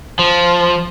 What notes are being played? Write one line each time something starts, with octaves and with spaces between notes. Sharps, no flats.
F3